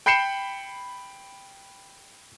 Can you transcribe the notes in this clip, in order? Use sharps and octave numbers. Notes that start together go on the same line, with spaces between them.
G5 B5 G6 C7 C#7 E7